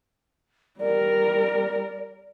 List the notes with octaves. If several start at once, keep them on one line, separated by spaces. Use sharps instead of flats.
G3 A#4 D5